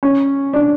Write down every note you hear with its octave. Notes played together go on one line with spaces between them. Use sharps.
C#4
D4